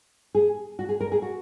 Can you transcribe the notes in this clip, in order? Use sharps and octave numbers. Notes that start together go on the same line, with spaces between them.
G#4
F#4
G#4
A#4
G#4
F#4